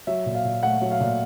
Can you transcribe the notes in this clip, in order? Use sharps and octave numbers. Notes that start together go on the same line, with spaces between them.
F#3 E5
A#2
F5
A#2
A3 F#5
F#3
F5
A#2